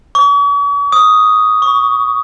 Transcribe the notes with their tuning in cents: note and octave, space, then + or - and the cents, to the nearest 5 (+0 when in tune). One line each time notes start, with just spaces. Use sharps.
C#6 +45
D#6 +5
C#6 +25